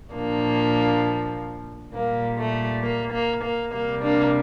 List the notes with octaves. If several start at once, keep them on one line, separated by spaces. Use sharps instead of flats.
A#2 F3 A#3 D4
A#2 G3 A#3
A3
A#3
A#3
A#3
C3 G3 A#3
A#3 D4